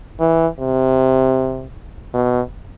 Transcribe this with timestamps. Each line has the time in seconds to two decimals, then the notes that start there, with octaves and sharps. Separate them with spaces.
0.20 E3
0.59 C3
2.14 B2